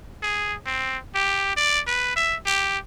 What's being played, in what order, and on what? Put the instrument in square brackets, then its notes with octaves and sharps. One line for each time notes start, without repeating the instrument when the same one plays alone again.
[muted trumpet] G#4
C4
G4
D5
B4
E5
G4